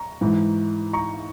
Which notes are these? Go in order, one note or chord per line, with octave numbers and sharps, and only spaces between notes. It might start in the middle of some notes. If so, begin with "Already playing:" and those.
Already playing: A#5 C#6
G#2 E3
A#5 C#6